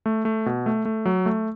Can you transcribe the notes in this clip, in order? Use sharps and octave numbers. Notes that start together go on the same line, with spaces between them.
A3
A3
B2
A3
A3
F#3
A3